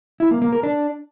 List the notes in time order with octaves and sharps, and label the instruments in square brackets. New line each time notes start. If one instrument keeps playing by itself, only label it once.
[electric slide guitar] E4
A#3
A#3
A#4
D4